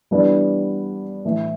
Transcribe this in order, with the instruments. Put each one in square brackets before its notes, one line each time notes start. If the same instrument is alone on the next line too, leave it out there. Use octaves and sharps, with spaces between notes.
[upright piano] E3 G3 B3 D4
A2 E3 A3